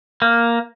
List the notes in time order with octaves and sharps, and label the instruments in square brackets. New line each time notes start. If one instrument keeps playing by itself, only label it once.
[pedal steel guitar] A#3